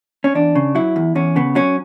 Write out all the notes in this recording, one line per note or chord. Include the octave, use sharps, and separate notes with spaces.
C#4
E2 D4
C#3
F#3 E4
E2
E2 C#4
C#3 B3
F#3 C#4